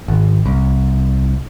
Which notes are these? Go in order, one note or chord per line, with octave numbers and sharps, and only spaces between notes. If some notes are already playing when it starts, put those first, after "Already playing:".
G#1
C2